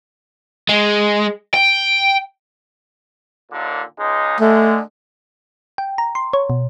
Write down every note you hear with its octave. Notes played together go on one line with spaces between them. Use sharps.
G#3
G5
D#2 A#2 D3
C#2 G#3 D#4
D3 G#3 A3
G5
A#5
C6
C#5
B2